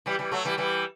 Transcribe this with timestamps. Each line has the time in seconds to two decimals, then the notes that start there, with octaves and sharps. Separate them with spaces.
0.06 E3 G3
0.19 E3 G3
0.32 F#3 A3
0.45 E3 G3
0.58 E3 G3